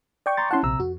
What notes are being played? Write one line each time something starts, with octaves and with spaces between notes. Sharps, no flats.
D5 G5 C#6
A#5 C6 A6
C#4 E4 F#5 A5 C6
A#1 C3 A#5 E6
F2 F#4